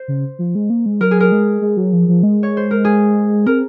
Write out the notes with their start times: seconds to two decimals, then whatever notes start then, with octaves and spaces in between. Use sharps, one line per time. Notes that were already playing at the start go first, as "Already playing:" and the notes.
Already playing: C5
0.08 C#3
0.39 F3
0.55 G#3
0.70 A#3
0.86 G#3
1.01 F#3 A#4
1.11 G#4
1.20 A#4
1.32 G#3
1.62 G#3
1.77 F#3
1.93 F3
2.08 F3
2.23 G#3
2.43 C#5
2.57 C5
2.71 A#4
2.85 G#4
3.46 C4 A#4